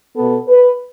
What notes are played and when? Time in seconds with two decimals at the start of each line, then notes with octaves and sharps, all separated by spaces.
0.15 B2 B3 A4
0.48 B4